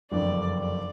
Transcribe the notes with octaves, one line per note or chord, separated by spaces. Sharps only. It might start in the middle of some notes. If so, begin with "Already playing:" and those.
F#1 F2 D3 G3 D5
D5